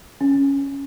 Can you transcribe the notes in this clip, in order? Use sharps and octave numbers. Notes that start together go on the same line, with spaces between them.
C#4